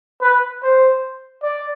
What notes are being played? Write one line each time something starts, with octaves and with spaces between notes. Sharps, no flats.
B4
C5
D5